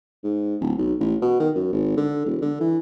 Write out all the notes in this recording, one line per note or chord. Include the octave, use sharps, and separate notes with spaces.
G#2
D1
B1
A1
B2
D#3
F#2
G#1
D3
E1
D3
E3